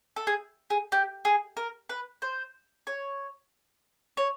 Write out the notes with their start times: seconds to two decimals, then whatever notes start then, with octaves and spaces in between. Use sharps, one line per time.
0.16 A4
0.27 G#4
0.70 G#4
0.92 G4
1.25 G#4
1.57 A#4
1.89 B4
2.22 C5
2.87 C#5
4.17 C#5